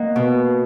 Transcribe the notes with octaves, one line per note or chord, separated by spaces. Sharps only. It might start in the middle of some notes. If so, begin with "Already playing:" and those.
Already playing: A#3 D#5 F#5
B2